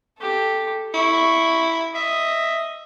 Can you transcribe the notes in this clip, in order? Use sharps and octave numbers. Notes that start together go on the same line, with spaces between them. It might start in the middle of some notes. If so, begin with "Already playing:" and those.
G4 A4
E4 C#6
D#5 E5